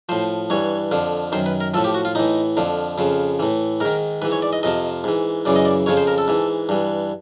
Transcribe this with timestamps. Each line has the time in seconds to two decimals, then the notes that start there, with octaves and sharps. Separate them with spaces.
0.09 A2 F3 C5
0.50 G2 E3 C#5
0.91 F2 D3 F3
1.32 F#2 D#3 C5
1.46 B4
1.61 A#4
1.74 F3 A4
1.77 A2
1.84 G4
1.94 F#4
2.05 F4
2.15 A2 E3 D#4
2.57 F2 D3 F3
2.98 F2 C#3 F3
3.39 A2 E3
3.80 G#2 D#3 A#4
4.22 G#2 E3 B4
4.32 C#5
4.42 D5
4.53 D#5
4.63 F2 C3 F3 D#5
5.04 G#2 E3
5.45 F#2 C#3 E3 D5
5.56 D#5
5.65 D5
5.86 F2 C#3 F3 C#5
5.97 C5
6.07 A#4
6.18 A4
6.28 G#2 E3
6.69 G2 E3